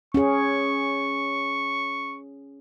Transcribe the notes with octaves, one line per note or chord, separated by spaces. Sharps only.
C#4 G#4 C#6